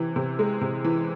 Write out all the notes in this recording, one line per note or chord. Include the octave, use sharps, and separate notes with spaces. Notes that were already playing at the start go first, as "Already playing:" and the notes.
Already playing: C3 E3
C3
G#3
C3
E3